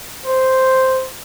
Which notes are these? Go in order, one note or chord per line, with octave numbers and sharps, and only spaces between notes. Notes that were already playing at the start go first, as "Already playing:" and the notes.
C5